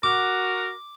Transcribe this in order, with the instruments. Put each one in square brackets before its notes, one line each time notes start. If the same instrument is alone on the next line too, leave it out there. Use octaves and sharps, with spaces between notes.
[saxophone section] F#4 [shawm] A#4 [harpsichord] D6